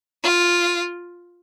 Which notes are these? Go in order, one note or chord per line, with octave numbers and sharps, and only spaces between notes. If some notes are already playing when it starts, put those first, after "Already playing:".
F4